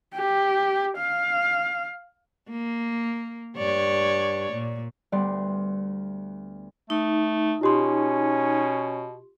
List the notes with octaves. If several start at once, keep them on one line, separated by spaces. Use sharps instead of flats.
G4
F5
A#3
G2 C#5 D5
A#2
D2 G3 B3 D5 C6
A3 D#4
B2 C#4 F4 G4 C6